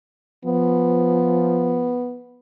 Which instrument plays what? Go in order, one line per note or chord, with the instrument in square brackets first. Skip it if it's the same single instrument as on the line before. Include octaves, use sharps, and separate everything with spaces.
[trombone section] F3 [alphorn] B3